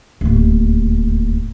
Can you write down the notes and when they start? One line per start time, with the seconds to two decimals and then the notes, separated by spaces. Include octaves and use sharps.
0.21 D1 D#2